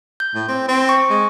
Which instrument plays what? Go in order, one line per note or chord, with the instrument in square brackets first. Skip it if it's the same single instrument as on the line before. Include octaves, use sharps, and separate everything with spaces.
[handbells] G6
[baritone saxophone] A2
C4
C4
[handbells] C#6
[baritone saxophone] G#3